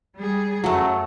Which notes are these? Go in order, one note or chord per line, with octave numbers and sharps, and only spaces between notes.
G3 G#4
F#2 F#3 A3